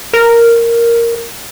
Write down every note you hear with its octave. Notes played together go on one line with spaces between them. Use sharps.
A#4